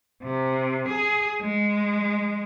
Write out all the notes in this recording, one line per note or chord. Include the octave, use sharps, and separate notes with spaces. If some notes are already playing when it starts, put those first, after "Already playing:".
C3
G#4
G#3